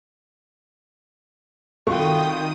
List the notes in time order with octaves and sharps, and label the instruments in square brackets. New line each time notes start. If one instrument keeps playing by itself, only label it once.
[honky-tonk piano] C2 F#4 C#6 [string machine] D#3 D#6 [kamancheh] F4 G5 [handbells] A4